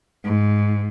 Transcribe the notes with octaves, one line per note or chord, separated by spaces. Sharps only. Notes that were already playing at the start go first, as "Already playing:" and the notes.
G#2